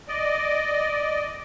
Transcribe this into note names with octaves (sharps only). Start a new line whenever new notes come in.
D5 D#5